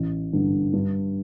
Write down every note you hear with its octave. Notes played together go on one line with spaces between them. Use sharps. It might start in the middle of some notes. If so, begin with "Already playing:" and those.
Already playing: A1
G2 D3
G2